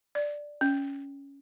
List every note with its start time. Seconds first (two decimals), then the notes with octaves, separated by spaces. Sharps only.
0.15 D5
0.61 C#4